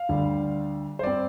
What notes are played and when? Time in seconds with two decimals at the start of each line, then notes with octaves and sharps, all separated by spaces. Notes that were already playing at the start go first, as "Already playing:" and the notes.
Already playing: F5
0.09 D2 D3 G3
0.99 C5
1.03 G2 G3 C4 D5